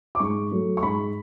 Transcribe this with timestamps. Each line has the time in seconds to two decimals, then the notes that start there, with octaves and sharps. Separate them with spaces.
0.15 D6
0.19 G#2 C#6
0.51 F#3 A3
0.77 C#6
0.83 G#2 B5